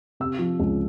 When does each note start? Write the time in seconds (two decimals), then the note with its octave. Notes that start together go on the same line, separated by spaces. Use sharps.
0.20 C3 E6
0.39 F3
0.60 C#2